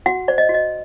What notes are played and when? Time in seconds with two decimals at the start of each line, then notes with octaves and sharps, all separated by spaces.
0.06 F#4 F#5
0.28 C5 D5
0.38 D#5
0.49 F#4
0.54 D#5